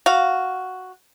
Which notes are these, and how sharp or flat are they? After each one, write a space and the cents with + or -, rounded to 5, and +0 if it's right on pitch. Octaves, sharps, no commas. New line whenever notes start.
F#4 +0 F5 +0